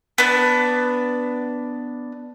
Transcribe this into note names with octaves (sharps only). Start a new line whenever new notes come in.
B3 D4